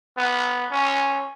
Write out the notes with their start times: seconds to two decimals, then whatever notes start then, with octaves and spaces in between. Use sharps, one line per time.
0.17 B3
0.71 C#4